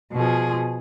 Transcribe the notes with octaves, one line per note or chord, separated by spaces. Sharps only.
B2 F3 G#4